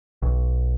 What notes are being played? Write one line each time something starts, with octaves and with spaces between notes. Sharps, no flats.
B1